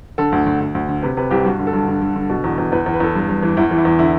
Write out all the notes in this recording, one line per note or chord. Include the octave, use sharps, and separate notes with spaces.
D3 A4
D2
D2
D2
D2
D3
C3 B4
C3 B4
C2 G4
G2 F#4
D3
A4
G2
D3
D3
D3
B2
E2
E2
E2 B4
E2
B4
E2 A4
G2
G2
E3
E2 E4
E3
E4
E2
D3 E4